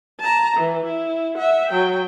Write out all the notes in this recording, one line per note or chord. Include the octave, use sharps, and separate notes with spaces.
A5 A#5
E3
E4
E5 F#5
F#3 G5